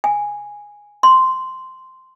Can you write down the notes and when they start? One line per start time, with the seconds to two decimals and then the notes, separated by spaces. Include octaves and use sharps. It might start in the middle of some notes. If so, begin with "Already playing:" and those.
0.04 G#5
1.03 C6